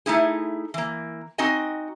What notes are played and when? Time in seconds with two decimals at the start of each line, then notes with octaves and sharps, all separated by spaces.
0.06 A3 D#4 E4 G#4
0.74 E3 A#3
1.38 C4 D#4 F#4 D#5 G#5